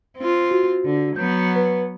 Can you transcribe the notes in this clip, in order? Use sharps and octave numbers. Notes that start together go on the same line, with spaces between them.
C4 F4
F#4
D3
F#3 B3 G6
B4